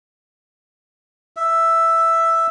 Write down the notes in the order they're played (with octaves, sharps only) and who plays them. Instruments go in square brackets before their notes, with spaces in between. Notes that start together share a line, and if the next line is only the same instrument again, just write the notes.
[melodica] E5